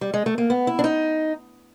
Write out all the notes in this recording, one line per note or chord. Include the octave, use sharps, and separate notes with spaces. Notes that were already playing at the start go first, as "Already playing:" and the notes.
G3
G#3
A3
A#3
B3
E4
D4
D#4